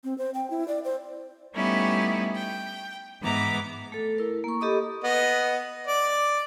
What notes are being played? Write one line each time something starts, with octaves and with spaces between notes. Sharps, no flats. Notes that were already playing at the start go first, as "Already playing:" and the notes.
C4
C5
G5
E4
D5
C5
G3 A3 B3 C#4 D#4 E4
G5
G#2 E3 B3 A#5 D6
A3 A4
E4 A#4
A#3 C#6
G4 A4 D#5 B5 D6 D#6
B3 D#5
D5